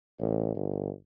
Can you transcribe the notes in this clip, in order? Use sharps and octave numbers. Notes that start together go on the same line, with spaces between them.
A1
G1